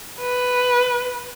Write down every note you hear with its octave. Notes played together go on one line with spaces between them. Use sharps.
B4